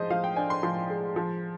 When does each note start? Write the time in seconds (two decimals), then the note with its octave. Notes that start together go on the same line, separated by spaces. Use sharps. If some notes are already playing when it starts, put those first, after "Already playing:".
Already playing: F3 G#3 C5 D#5
0.10 F3 F5
0.24 G5
0.36 D4 G#5
0.50 C6
0.63 F3 C6
0.90 G#3
1.16 F3